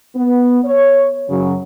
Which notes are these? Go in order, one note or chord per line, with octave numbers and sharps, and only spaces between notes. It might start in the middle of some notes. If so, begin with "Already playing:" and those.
B3
C#5
F#2 C#3 F#3